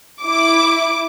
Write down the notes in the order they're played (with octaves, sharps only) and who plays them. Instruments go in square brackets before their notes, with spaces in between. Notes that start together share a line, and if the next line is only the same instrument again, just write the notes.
[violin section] E4 D6